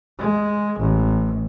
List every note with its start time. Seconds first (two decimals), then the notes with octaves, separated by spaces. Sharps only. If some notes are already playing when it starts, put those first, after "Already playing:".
0.19 G#3
0.80 A1